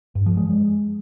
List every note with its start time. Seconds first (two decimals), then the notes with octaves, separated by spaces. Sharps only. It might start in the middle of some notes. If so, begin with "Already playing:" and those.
0.15 G2
0.26 F3
0.37 G#3